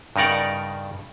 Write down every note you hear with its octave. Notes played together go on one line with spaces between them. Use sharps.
G2 C#3 D#4 A#4 D5 F#5